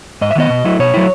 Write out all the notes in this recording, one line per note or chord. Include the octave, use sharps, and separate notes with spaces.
G#2 D#5
E5
D#3 G#3 B3 D#5
B2
F#3 A3 E4
B2 C#5
F#3 A3 E4